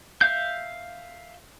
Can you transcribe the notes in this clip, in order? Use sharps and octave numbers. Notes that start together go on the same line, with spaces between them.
E5 F5 G6